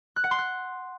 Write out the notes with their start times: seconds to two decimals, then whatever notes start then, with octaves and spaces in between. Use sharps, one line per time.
0.16 F#6
0.24 F#5
0.31 C6
0.38 F#6